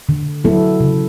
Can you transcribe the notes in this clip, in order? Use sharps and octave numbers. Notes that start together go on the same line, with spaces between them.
D3
F#3 B3 E4 A4
C#3